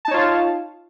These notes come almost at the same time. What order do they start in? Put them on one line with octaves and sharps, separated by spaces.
A5 D#4 C#5 F4 F5